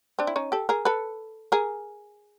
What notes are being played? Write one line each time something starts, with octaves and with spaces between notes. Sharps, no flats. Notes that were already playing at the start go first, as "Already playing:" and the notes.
C4 D4
E4
C#4 D#4
G4 A4
G#4 A#4
A4 B4
G#4 A#4